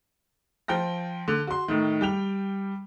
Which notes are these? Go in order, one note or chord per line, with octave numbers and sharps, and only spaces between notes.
F3 G5 F6 A#6
D3
F#4 C6
A2 D#3
G3 G5 F7